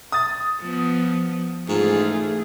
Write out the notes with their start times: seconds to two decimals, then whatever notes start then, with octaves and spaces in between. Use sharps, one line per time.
0.12 D#6 A6
0.62 F3 B3
1.69 G#2 C#3 E3 A3 F4 G#4